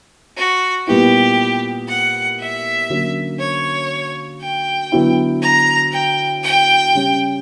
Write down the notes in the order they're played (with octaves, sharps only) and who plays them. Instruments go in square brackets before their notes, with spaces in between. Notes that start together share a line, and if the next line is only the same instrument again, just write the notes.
[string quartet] F#4
[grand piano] A#2 G3 B3 E4 [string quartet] G4
[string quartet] F#5
E5
[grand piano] D3 F#3 A#3 C#4
[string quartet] C#5
G5
[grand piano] D3 F#3 B3 E4
[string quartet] A#5
G5
G5
[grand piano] C#3 G3 C#4